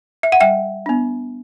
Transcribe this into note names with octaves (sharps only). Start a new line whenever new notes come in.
E5
F#5
G3 E5 G5
B3 D4